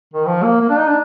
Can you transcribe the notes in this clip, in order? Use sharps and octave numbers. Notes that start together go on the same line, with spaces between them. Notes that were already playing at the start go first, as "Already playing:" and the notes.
D#3
F3
A#3
A#3
D4
D#4
D4